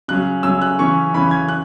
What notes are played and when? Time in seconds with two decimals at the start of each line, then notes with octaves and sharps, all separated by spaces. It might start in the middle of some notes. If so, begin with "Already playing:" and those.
0.08 C#3 F#3 C#4 F#6
0.43 C#3 F#3 C#4 E6
0.61 F#6
0.79 C#3 E3 C#4 C#6
1.14 C#3 E3 C#4 B5
1.31 G#6
1.49 F#6